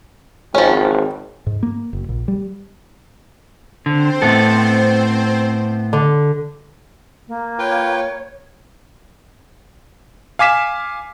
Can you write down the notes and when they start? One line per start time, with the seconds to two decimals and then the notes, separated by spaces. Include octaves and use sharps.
0.55 G#1 F3 C#4 C5 C#5
1.47 G#2
1.63 A#3
1.93 F#1
2.09 A#1
2.28 G3
3.86 D3 C4 C5
4.22 A2 B3 A4
5.93 D3
7.27 A#3
7.59 F4 B4 C#5 G5
10.39 F5 G#5 D6 B6 E7